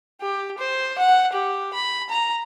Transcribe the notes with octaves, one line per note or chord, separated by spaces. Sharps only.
G4
C5
F#5
G4
B5
A#5